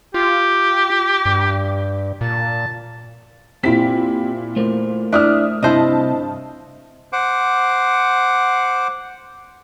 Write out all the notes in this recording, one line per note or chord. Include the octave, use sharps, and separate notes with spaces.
F4 G4
G2
A#2 A5
A#2 C4 E4 G4 G5 B6
A3 A#4 C5
D4 E4 E5 D#6 F6
G2 C3 E4 C5 D#5 E5 A5
C5 F#5 D6